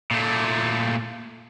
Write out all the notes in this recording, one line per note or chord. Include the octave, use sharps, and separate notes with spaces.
A#2 A3